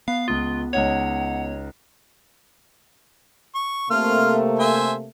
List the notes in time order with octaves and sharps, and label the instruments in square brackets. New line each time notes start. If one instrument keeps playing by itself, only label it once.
[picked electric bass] B3 [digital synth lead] F5
[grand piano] C#2 D#6 [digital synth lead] F4
[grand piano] C#2 D#4 F7 [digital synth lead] C#5 [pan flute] F#5
[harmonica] C#6
[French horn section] C3 A3 A#3 [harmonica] F4 C6 F6
[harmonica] C5 E5 G#5